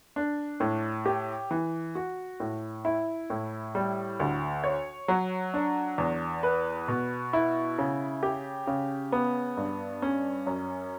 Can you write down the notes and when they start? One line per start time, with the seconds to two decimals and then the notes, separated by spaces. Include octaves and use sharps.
0.16 D4
0.60 A2
1.06 G4
1.51 E3
1.95 F#4
2.40 A2
2.85 E4
3.30 A2
3.75 G3
4.20 D2
4.64 C#5
5.08 F#3
5.54 D4
5.98 E2
6.43 B4
6.88 B2
7.33 E4
7.78 C#3
8.23 G4
8.67 C#3
9.12 B3
9.57 G2
10.02 C#4
10.47 F#2